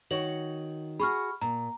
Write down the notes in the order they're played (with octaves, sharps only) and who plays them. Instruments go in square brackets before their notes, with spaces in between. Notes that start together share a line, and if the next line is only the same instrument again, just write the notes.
[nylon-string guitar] D#3 F#4 C#5 [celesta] F#7
[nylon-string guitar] F#4 G#4 [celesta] B5 C#6 F6
[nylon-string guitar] A#2 [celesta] A#5